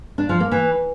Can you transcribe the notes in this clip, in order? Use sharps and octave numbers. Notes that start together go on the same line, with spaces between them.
D4
F3
A#3
E3